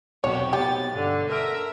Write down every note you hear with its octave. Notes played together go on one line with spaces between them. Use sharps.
B1 C3 F#4 G4 C#5
B3 G4 A6
G2 D3
A4 A#4 E5 A#5 F6 D7